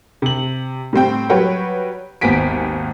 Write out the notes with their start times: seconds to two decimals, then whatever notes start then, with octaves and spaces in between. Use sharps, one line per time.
0.22 C3 F#7
0.93 A2 G3 C4 G5
1.30 F#3 G3 B4 C#5 F#5 G5
2.21 G#1 D#2 B3 G#5 B6 D7